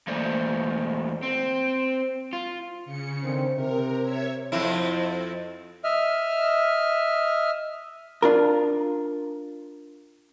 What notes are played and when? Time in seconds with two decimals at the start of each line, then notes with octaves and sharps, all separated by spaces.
0.07 E2 A3 A#3 C5 D5
1.23 C4
2.33 F4
2.86 C#3 C#7
3.23 D3 D#3 C4
3.55 C3 A#4
4.03 C#5 E5 G#6
4.52 F2 C4 E4
5.84 D#5 E5 F6
8.22 D4 F4 A#4